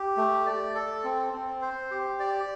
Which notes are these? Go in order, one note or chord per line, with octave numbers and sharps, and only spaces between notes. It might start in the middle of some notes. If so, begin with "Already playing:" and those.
Already playing: G4
A3
D5
A4
C4
C4
C5
G4
D5